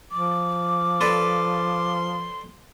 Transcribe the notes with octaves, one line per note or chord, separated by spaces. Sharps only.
F3 D6
A4 B4 D5 C6